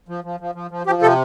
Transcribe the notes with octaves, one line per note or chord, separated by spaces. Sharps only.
F3
F3
F3
F3
F3
F3 G4
C3 A4